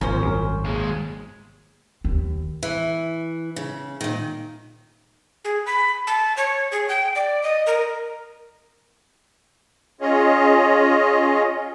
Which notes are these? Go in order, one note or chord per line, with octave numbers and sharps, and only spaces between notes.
G#1 A#2 C#4 C5
C2 F#2
D#2 G#3
D#2
E3
C#3
A#2 D#3
G#4
B5
A5
C#5
G#4
G5
D5
D#5
A#4
C#4 F4 G#4 C#5 D#5